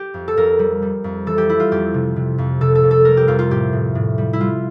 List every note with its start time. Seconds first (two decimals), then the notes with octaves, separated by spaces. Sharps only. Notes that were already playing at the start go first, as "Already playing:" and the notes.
Already playing: G4
0.14 F2
0.28 A4
0.37 F2 A#4
0.59 G3
0.82 G3
1.04 F2
1.26 E3 A4
1.38 G4
1.49 G3 E4
1.60 F4
1.71 F2 G4
1.94 C3
2.16 C3
2.38 F2
2.61 C3 A4
2.75 A4
2.83 F2
2.91 A4
3.05 G3 A#4
3.17 G4
3.28 F2 F4
3.39 F4
3.50 A2 G4
3.73 A2
3.95 A2
4.18 G3
4.33 E4
4.40 G3 F4